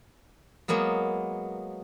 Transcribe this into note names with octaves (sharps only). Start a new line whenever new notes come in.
F#3 G#3 A#3 B3